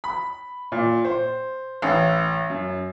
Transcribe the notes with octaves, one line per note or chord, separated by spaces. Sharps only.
B5
A#2
C5
A1
F#2